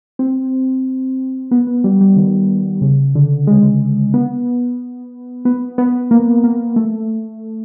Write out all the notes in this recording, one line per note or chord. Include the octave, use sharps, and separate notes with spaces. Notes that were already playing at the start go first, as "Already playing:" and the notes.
C4
B3
B3
G3
G3
D#3
C#3
D3
G#3
B3
B3
B3
A#3
A#3
A3